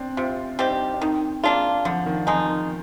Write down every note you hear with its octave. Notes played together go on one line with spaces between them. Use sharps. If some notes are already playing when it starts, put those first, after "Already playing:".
Already playing: C4 D4
C3 F4
G3 C4 D#4 G4
D4
D#4
D4
D#3 C4
G#3 A#3 D4 F4
D3 F3
D#3
F3 G#3 D#4
D#3